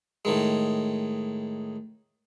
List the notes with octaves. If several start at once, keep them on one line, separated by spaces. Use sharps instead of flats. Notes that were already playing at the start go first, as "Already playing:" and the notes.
A2 D#3 G#3